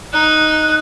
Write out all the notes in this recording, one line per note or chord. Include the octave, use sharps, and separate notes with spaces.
D#4 F#6